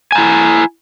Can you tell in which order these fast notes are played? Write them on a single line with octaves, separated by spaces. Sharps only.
G#5 A#5 E4